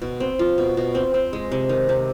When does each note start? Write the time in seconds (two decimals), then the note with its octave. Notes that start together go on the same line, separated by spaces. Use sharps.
0.02 B2
0.20 C4
0.39 F4
0.58 B2
0.77 B2
0.95 C4
1.14 C4
1.33 G#3
1.52 C3
1.69 D#3
1.89 C3